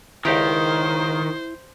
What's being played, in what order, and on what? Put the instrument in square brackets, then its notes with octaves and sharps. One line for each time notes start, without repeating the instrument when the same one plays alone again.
[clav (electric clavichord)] C#2 G4 A#4 [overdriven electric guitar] D#3 [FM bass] E4 [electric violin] C5